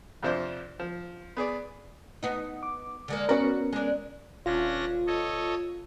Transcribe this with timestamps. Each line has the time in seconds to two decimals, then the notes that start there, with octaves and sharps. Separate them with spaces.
0.23 F2 C3 F3 D4 C5
0.80 F3
1.37 B3 G#4 D5
2.23 B3 D#4
2.63 D6
3.08 D3 G#3 A#3
3.29 B3 C#4 F#4 A#4 B4 D5
3.73 G#3 D4
4.46 D#1 C#4 D4 F4 A#6
5.07 A4 C#5 D#5